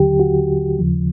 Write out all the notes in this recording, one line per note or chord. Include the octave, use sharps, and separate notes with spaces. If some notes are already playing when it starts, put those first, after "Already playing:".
Already playing: D#2 D3 F#3 G4
F#4
D#2 C#3 F3